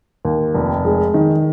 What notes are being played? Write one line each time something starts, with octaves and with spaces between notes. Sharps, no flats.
D#2
F1
G#3
D#3